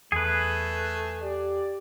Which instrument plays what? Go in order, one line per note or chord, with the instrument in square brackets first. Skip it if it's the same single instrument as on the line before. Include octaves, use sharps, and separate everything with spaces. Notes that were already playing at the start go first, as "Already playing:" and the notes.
[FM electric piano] E2 [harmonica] A3 [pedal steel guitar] G#4 B4
[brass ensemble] G4 D5